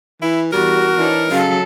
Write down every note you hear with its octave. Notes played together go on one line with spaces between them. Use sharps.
E3 E4
E2 G3 F#4 A#4
E3 D4 D#4 C#5
C#3 F#3 A4 F5